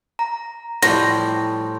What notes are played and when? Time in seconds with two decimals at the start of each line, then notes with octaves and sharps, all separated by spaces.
0.19 A#5
0.82 A2 E3 F3 G3 C6 A#6